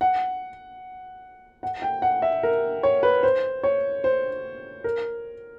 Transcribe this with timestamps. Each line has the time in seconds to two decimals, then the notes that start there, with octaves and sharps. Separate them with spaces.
0.01 F#5
1.63 F#5
1.82 G5
2.02 F#5
2.22 E5
2.43 A#4
2.83 C#5
3.03 B4
3.23 C5
3.63 C#5
4.04 C5
4.84 A#4